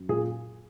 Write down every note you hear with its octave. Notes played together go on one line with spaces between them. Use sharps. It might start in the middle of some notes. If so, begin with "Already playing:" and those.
Already playing: F#2
A#2 G#4